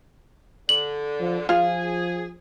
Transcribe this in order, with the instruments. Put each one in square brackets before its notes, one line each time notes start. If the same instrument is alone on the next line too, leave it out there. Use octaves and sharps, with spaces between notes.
[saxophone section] D3 [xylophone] F#7
[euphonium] F3
[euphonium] F3 [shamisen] F4 F5 [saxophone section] G#4